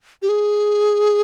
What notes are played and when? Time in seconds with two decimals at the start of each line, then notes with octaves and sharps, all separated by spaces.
0.22 G4
0.29 G#4